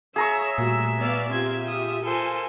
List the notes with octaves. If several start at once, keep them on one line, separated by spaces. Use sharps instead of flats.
G#4 C#5 E5 A#5 C#6 E6
A#2 G3 A3 F#4
B3 D5 F5
C4 F4 G4 E5 G#6
D#6
F4 A4 A#4 C5 G#5